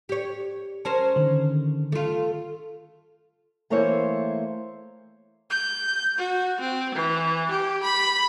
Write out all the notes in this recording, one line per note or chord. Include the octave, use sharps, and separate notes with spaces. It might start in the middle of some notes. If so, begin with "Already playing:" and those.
G4 C#5
C#4 A#4 C5 A5
D3 D#3
A3 F4
E3 A3 A#3 E4 C5 C#5
G6
F#4
C4
E3
G4
B5